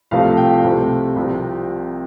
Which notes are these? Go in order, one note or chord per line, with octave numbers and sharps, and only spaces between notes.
C2 C3 F3 A3 F5
G5
C2 C3 A3
C2 C3 F3